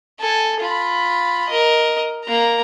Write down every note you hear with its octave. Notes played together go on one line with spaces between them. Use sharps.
A4 G#5
F4 B5
A#4 D#5
A#3 A#5